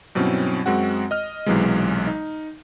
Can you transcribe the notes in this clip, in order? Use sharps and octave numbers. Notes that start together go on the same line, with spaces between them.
G2 B2 F#3 C4 C#4 E4
F#2 G#3 C4 F#4 F#5
D#5 F6
B1 C3 E3 F#3 G#3
D#4